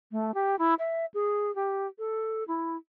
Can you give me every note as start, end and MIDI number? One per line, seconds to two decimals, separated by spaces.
0.12 0.34 57
0.34 0.56 67
0.59 0.74 64
0.79 1.06 76
1.14 1.54 68
1.55 1.87 67
1.99 2.44 69
2.48 2.77 64